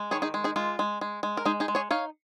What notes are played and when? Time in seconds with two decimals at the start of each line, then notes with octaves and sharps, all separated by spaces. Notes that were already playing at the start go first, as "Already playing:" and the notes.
Already playing: G#3
0.11 D#3 G#4 C#5
0.22 D#4 G#4
0.34 G#3
0.44 D#4 G#4
0.56 G#3 F4
0.79 G#3
1.01 G#3
1.23 G#3
1.37 A#4
1.45 G#3 D#4 G#4
1.60 D#4 G#4
1.68 G#3
1.75 G#4 C#5
1.91 D#4 C#5 F5